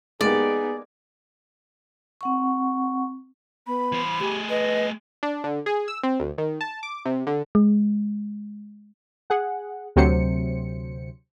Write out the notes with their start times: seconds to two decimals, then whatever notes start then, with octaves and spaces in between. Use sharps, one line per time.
0.21 G#3 A#3 B3 D#4 G4 G#4 D5
2.21 C4 F#5 C#6
3.67 B3 B5
3.92 E3 C5
4.20 A3 G4 G#4
4.49 B4 D#5
5.23 D4
5.44 D3
5.66 G#4
5.88 E6
6.03 C4
6.20 D2
6.38 D#3
6.61 A5
6.83 D6
7.05 C3
7.27 D3
7.55 G#3
9.30 G#4 F#5
9.96 D2 C3 F#3 C5 C#7